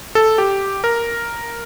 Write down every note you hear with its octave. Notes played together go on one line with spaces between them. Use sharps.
A4
G4
A#4